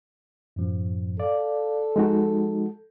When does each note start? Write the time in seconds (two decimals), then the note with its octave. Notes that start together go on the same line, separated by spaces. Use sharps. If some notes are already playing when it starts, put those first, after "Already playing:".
0.56 F#2 A2 F3
1.20 A4 D5 F5
1.96 F3 G#3 D#4 F#4